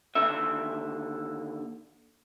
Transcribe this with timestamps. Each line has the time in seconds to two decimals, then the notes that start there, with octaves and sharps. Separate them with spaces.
0.15 D#2 D3 E5